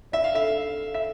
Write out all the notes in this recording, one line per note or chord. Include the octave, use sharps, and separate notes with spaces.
D5 E5
F5
A4 E5
F5
F5
E5